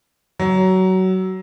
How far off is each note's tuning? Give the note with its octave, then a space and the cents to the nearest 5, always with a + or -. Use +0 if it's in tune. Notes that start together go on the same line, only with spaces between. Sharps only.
F#3 +20